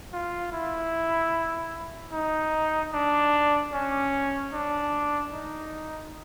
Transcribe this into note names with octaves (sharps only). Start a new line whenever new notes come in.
F4
E4
D#4
D4
C#4
D4
D#4